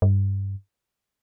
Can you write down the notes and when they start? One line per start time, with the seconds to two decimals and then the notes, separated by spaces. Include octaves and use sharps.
0.02 G2